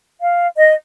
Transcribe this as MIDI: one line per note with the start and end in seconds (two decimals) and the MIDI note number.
0.21 0.47 77
0.57 0.74 75